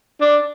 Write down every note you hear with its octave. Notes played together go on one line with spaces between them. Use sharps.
D4